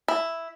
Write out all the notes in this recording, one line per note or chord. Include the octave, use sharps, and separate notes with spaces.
E4